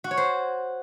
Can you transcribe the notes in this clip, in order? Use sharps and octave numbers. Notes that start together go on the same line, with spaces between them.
F#4
C#5
C5